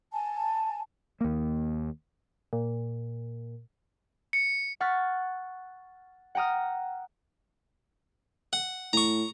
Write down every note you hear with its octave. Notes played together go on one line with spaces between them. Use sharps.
G#5 A5
D#2 A#3
A#2
C#7
F#5 C#6 F6 F#6 A6 B6
F#5 G5 A#5 D#6 F6
F#5
A2 A#5 C#6